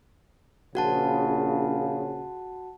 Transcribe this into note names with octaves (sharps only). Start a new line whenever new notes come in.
A#1 C#3 F#4 F#5 A5